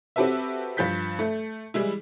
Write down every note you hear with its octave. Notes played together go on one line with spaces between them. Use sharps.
C4 F#4 G4 A4 B4 E5
G2 F3 G6 B6
A3
E3 G3 G#3 E4